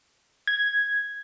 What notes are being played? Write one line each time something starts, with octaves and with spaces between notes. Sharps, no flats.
G#6